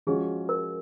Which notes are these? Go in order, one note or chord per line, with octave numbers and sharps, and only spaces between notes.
F3 G#3 C#4 F#4 G#4
A#4